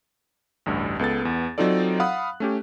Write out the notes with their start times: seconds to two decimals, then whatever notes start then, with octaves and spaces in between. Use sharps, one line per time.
0.66 A1 D2 G2
0.99 C#2 B3 A4 A6
1.21 E2 B3
1.58 F#3 C4 D#4 F4 A4 D5
2.00 F5 F#5 B5 D#6 F#6
2.40 A3 C#4 G4